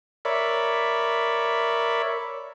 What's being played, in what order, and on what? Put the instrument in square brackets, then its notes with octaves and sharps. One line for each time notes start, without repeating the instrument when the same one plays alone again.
[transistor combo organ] A#4 C#5 D5 E5 B5